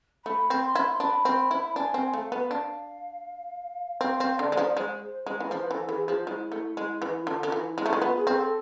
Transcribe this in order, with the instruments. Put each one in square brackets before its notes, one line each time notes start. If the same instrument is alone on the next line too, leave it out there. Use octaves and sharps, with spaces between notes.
[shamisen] A3 [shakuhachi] B5
[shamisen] C4
[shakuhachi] C6
[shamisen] E4
[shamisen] D4 [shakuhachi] B5
[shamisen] C4
E4
[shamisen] D4 [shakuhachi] G#5
[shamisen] C4
[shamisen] A3 [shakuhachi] F5
[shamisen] B3
D4
[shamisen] C4 [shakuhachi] F5
[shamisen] C4
[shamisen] D3 [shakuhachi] D5
[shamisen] G#3
F3
[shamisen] G#3 [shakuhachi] C5
[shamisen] G#3
E3
[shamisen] F3 [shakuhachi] B4
[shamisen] E3 [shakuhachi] A4
[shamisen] E3 [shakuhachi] G#4
[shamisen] F3 [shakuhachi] F4
[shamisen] G#3 [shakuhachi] E4
[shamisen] A3
G#3
[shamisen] E3 [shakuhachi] E4
[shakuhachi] F4
[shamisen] D3
[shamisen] D3 [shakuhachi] F4
[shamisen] E3
[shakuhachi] E4
[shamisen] G#3 [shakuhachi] E4
[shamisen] A3
G#3
[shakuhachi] F4
[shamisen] B3
[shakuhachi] G#4
[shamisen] C4
[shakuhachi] A4